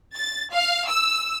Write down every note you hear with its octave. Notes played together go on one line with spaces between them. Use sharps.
A6
F5
E6